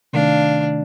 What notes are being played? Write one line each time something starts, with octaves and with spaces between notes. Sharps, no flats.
C3 D#3 A3 D4 F5